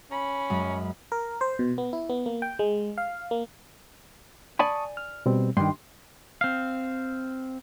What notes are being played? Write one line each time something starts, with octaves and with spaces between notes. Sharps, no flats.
C#4 B5
F#2 F#3 G#3
A#4
C5
B2
B3
E4
B3
A#3
G5
G#3
F5
A#3
D5 G#5 A5 B5 C#6 D#6
F6
B2 G3 C4
G2 D#3 C6
C4 F5